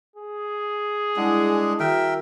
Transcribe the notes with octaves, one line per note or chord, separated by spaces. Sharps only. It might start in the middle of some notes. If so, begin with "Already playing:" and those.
G#4
G3 G#3 D4 E4 F#5
D#3 F#4 A#4 E5 G5